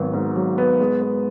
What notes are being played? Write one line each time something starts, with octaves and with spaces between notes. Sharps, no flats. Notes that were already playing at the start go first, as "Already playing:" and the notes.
Already playing: G#1 F#3 B3
G#2
F#3
B3
G#3
B3